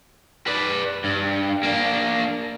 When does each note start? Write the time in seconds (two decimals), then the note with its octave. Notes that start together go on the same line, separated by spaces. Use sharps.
0.47 B4 D5
1.04 G2
1.63 A#3 D4